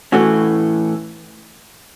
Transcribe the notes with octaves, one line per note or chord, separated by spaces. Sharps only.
A2 E3 A3 C#4 F#4